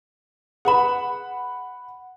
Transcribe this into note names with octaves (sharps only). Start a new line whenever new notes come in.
G#4 B4 F#5 B5 E7